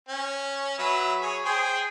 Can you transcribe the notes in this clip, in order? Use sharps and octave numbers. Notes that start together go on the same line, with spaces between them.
C#4
F#3 B4 E5
G#4 C#5
G#4 C5 G5